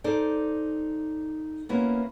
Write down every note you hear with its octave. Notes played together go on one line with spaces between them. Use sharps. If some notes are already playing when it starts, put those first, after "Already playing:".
D#4 A4 C5 D5
A#3 B3 C#4 E4